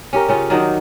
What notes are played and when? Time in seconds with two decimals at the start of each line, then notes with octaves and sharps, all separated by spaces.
0.13 C#4 G4 A#4
0.28 C#3 C#4 F4
0.50 D#3 F#3 D4 D#4